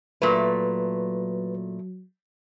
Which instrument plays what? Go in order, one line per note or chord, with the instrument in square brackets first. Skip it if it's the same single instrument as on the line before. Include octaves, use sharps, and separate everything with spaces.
[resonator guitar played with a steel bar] A#2 A3 [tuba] F#3 [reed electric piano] B4